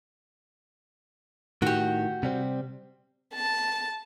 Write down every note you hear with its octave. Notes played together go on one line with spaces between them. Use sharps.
A2 D#3 F#4 G4
C3 G3 C4
A5